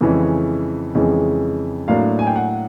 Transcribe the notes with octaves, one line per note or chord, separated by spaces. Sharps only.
F2 C#3 E3 G#3 C#4
F2 C#3 E3 G#3 C#4
A2 F#3 A#3 D4 F5
G#5
G5
F#5